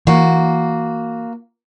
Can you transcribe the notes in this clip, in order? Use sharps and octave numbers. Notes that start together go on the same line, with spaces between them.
E3 A#3 F#4